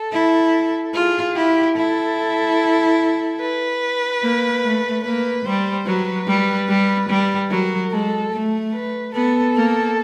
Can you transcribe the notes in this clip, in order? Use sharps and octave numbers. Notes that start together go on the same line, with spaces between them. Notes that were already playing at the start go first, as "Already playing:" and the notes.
Already playing: A4
E4
F4 G#4
E4 G4
E4 A4
B4
A#3
A3
A#3 B4
G3 C5
F#3 B4
G3
G3
G3
F#3 A#4
G#3 A4
A3
B4
B3 A4
A#3